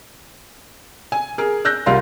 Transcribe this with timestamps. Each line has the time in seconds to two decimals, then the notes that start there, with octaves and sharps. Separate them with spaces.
1.12 G#5
1.38 G#4 A#4
1.65 E6 F#6 G6 A#6
1.86 C2 G3 F4 A#4 F5 C6